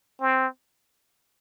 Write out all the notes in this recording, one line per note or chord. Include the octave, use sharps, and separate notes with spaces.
C4